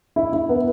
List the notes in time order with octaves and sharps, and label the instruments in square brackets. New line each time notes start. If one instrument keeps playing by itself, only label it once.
[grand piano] E4
E4
B3